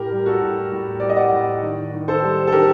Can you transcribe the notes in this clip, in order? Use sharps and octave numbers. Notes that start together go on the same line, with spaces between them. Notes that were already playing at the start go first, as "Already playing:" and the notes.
Already playing: A2 G4 A#4
G3
F#4 A4
A2
A2
G3 D5
D#5
D5 F#5
A2
D#3
D#3
A4 C5
G3
A4
D#3 G4 A#4